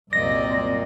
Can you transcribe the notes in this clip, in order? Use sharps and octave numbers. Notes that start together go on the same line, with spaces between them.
C2 F#2 A#2 A#3 C4 D5 D#5 A#6